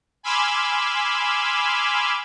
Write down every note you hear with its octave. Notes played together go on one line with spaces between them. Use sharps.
G#5 B5 C6 D6 E6 F6